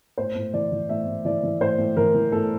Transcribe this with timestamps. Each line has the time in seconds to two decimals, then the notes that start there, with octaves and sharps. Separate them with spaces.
0.18 A2 C5
0.35 A2
0.53 E3 D5
0.72 E3
0.89 A2 E5
1.07 A2
1.25 E3 D5
1.43 E3
1.61 A2 C5
1.78 A2
1.97 E3 A#4
2.14 E3
2.32 A2 A4